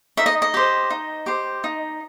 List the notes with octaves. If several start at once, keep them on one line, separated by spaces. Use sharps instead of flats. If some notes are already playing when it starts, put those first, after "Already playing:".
D#4 E5
D#5
D#5
G4 C5
D#4
G4 C5
D#4